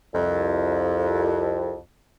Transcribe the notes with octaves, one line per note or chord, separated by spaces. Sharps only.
C2 F2